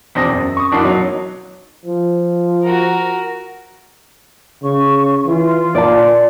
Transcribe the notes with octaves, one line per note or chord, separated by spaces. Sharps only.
E2 B2 C4 D4 D#6 A#6
F#2
C#6 D#6
F#1 E3 D4 F#4 D#6 C7
F#3 D#4
F3
F#4 A#4
C#3 C#6
E3 F4
A#2 D5 A5